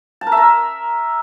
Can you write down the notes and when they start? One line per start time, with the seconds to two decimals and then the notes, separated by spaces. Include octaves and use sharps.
0.21 A5
0.27 A#4
0.32 E5
0.37 A#4